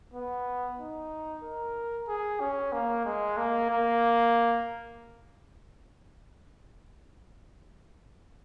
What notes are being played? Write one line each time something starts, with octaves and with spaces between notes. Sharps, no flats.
B3
D#4
A#4
G#4
C#4
A#3
G#3
A#3
A#3